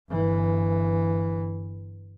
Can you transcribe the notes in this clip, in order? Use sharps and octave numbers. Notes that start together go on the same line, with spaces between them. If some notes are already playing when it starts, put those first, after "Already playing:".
G1 E3